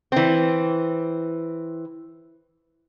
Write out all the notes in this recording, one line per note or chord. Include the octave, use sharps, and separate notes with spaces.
E3 C4